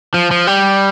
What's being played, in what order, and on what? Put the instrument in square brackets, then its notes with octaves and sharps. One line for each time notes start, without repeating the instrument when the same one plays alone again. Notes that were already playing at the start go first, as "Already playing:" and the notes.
[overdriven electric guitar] F3
F3
G3